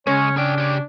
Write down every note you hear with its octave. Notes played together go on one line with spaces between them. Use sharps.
C#3 G#3 C#4 C#5
D4 G#4 G5
G4 C#5